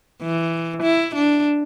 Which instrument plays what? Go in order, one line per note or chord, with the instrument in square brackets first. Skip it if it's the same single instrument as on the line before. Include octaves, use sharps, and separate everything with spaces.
[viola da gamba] E3
E4
D4